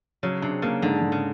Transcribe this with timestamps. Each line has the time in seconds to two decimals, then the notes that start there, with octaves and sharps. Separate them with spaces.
0.23 C#3 F#3
0.42 C3 D4
0.62 C#3 A#3
0.82 G#2 D3
1.02 G#2
1.12 C#3